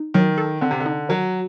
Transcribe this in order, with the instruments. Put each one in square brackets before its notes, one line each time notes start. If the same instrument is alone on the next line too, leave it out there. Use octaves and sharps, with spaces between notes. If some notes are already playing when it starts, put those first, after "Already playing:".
Already playing: [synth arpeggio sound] D#4
[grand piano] D#3 [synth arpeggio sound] F#3
[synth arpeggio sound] A4
[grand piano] D3 [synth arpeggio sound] C4
[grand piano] C3
D3
[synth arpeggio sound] D#4
[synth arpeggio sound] D#3 [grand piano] F#3